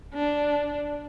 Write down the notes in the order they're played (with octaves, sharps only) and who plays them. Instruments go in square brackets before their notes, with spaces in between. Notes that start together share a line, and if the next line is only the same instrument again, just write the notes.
[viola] D4